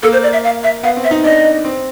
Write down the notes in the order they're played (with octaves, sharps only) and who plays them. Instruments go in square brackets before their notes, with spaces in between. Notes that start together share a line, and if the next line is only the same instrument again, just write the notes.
[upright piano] A#3 [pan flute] A4
[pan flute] C5
D5
E5
F5
E5
[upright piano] B3 [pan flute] F5
[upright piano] C4
[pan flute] E5
[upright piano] D#4
[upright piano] D4 [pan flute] D#5
[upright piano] C4